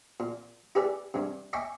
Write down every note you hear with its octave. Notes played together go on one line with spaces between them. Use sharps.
A#2
E4 G4 G#4 B4 D5 E5
G2 C3
D#5 E5 G5 G#5 C#6 D6